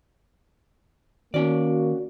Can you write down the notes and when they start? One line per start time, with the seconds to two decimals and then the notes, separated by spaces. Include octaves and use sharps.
1.34 D#3 A#3 C#4 F#4 D5